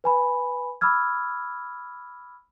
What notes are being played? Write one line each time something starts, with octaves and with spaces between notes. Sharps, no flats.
B4 G#5 B5
B5 D6 E6 F6 G#6